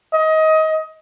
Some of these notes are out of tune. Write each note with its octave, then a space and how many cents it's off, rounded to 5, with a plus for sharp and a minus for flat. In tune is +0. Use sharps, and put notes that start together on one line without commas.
D#5 +25